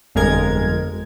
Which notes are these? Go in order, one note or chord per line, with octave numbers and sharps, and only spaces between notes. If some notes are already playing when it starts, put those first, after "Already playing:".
G1 F2 G#3 A#4 G#6